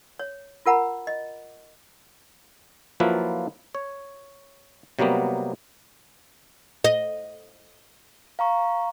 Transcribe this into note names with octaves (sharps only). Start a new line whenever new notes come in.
C#5
F4 A#4 F#5 A#5 B5
D#5
F3 F#3 A#3 E4 F4 B4
C#5
C3 F#3 G3 A#3 B3
D#5
F5 A#5 C#6